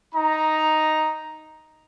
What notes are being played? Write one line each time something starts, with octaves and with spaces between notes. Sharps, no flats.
D#4 A#5